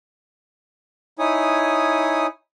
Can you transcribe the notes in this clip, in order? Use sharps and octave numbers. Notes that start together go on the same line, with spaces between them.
D#4 E4 C#5 G#5 D#6